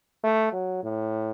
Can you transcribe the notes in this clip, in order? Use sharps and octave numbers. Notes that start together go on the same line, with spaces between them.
A3
F#3
A2